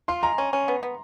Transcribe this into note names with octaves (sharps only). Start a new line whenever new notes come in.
F4 C6
G#3 A#5
C#4
C#4
B3
B3